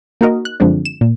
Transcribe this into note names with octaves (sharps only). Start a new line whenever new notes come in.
A#3 D#4 F#4 A#4 D#5
F#6
F#2 D3 F3 G#3 C4 D4
E7
A#2